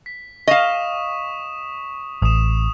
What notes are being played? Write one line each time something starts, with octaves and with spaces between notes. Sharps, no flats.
B6
D#5 F5 C#6 D#6 E7
A1 D#6 E7